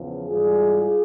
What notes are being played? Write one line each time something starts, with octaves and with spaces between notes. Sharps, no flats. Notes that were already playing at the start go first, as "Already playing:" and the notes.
Already playing: E2 C#3 F3
G#2 E3 G3 F4 G#4